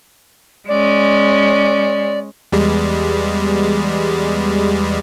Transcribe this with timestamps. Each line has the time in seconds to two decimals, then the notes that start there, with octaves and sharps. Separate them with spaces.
0.68 G#3 C#4 D5
2.52 E2 G3 G#3